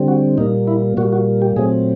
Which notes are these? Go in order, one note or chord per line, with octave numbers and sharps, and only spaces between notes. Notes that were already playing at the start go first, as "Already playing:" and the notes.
Already playing: D3 G3 C4
F#4
A#2 G3 A#3 D#4
E4
A#2 G3 A#3 F#4
F#4
G4
A#2 F#3 A3 C4 G#4